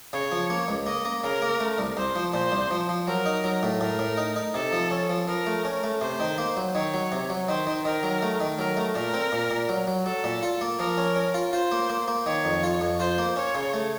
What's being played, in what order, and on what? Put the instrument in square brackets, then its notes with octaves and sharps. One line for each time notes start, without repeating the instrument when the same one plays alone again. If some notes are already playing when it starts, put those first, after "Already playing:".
[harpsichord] C#3 [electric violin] C#5
[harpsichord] F3
A#3
C#2
[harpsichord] A#3 [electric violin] D#5
[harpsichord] A#3
[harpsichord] C#3 [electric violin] A#4
[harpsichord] A#3
A3
C2
[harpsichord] C2 [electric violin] C5
[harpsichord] F3
[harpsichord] A#2 [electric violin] C5
[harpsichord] C2
F3
F3
[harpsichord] F#3 [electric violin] A#4
[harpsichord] D#4
F#3
A2
[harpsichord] A2 [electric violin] A#4
[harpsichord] A2
D#4
D#4
[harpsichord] C3 [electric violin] A4
[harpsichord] F3
C#4
F3
[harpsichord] F3 [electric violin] A#4
[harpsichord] A3
C#4
A3
[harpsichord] C3 [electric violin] C5
[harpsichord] D#3
A#3
F#3
[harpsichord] D#3 [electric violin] C#5
[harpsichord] F#3
C3
F#3
[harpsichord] D#3 [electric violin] C5
[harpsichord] D#3
[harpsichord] D#3 [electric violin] A#4
[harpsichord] F#3
A3
D#3
[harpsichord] F#3 [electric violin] A#4
[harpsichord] A3
[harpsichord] A#2 [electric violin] A#4
[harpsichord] C4
A#2
A#2
F#3
F#3
[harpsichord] F#3 [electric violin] A4
[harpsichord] A#2
F4
A#3
[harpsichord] F3 [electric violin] A#4
[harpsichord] C#4
C#4
F4
[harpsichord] F4 [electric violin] C5
[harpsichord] A#3
A#3
A#3
[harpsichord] D#3 [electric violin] C#5
[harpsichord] F2
F4
F2
[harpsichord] F4 [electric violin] C5
[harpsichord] A#3
[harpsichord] C#4 [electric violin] C#5
[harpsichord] C#3
A3